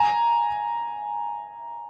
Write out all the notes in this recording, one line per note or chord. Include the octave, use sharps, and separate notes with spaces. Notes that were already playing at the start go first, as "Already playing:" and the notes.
Already playing: G#5 A#5